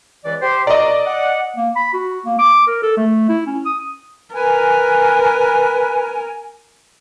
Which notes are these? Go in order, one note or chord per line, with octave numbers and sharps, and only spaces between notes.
C#2 E3 D5
G4 C5
C2 B2 D5 D#5 A#5
F#5
A#3
B5
F#4
A#3
D6
A#4
A4
A3
E4
C#4
D#6
A#4 B4 G#5